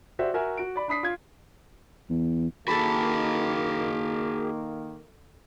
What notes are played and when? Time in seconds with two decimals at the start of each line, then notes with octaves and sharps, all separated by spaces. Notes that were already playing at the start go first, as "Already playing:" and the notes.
0.19 F#4 G4 C5 D5 E5
0.34 F#4 A#4 E5 G#5
0.57 F#4 D7
0.76 D5 B5
0.88 D4 B5 D#6 B6 C7
1.03 F4 G#6
2.09 E2
2.68 D#3 A#3 F#4 G#4 A4 A5 B5